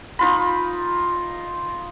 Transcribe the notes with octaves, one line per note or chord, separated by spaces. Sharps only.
D#4 F4 B5